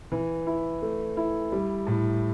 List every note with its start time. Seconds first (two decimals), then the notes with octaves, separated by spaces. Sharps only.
0.12 E3
0.47 E4
0.82 A3
1.17 E4
1.52 G3
1.87 A2